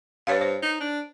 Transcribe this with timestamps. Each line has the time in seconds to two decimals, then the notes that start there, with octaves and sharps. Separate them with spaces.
0.27 G2 B4 C#5 F5
0.41 C5
0.62 D#4
0.80 D4